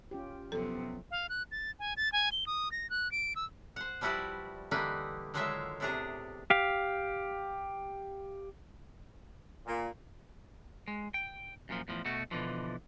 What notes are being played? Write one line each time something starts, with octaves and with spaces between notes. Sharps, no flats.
C#4 F4 G4
F#2 C3 F3 B3 A4
F5
F#6
A6
G#5
A6
G#5
G7
D#6
A#6
F#6
D7
E6
C5 F#5
F3 G3 E4 F#4 B4 D5
D3 E3 G3 A#3 D#4 B4
D3 D#3 F#3 G#3 F4 E5
A2 C3 B3 D4 G#4 A#5
G4 F5
A#2
G#3
G5
F#2 A#2 F3
E2 A2 F3
B2 A3 F#4
B2 D3 E3 F3